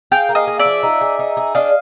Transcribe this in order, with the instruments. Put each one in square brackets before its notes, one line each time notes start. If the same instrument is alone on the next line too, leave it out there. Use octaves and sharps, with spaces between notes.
[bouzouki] G#4 [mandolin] F5 G5
[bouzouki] A#3
[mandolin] D#5 F5
[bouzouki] G#4
[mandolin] D5 E5
[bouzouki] F3
D#4
G#4
D#4
G#4
[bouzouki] D4 [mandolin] D#5 F5